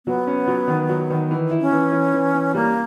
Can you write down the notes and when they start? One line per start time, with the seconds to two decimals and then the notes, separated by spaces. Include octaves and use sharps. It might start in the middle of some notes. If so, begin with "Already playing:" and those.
0.06 F#3 B3
0.27 C#4
0.47 F#3
0.68 D#3
0.89 F#3
1.10 D#3
1.31 E3
1.51 E4
1.61 C#4
1.72 E3
1.92 E3
2.13 E3
2.34 E3
2.54 G3 A#3